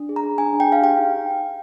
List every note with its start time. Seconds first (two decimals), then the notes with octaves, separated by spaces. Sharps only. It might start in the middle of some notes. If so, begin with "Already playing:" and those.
Already playing: D4
0.09 G#4
0.16 A#5
0.24 G#4
0.38 D4 G#5
0.53 D4
0.60 G5
0.68 G#4 F5
0.83 G4 G5
0.98 D#4